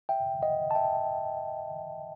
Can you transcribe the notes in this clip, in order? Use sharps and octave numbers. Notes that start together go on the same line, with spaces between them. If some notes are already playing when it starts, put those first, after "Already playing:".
E5 G5
D#5 F#5
A5
E5 G5